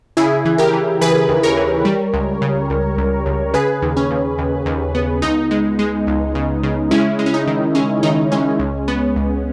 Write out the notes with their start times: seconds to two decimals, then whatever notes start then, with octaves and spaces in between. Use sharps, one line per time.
0.17 C#3 E4 G#4
0.45 E3
0.58 G4 A#4
0.73 E3
1.01 E3 G#4 B4
1.29 D#2
1.43 A#4 C#5
1.57 E3
1.85 G3
2.13 C#2
2.42 C#3
2.70 C#2
2.98 C#2
3.26 C#2
3.54 C#3 G#4 B4
3.82 D#2
3.97 C#4
4.11 D#2
4.38 D#2
4.66 D#2
4.95 B3
5.22 C#2 D#4
5.51 G#3
5.79 G#3
6.07 C#2
6.35 C#3
6.63 C#3
6.91 G#3 C#4 E4
7.19 G#3
7.26 C#4
7.34 D#4
7.47 D#3
7.75 G#3 C#4
8.03 D#3 D#4
8.32 G#3 C#4
8.59 C#2
8.88 B3
9.16 C#2